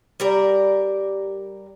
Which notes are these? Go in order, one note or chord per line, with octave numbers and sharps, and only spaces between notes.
G3 A#4 D5